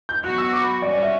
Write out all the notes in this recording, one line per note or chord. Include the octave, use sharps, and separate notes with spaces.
G6
F#3 B3 F#4 F#6
E6
D6
B5
G3 C#4 F#4 D5
D5
E5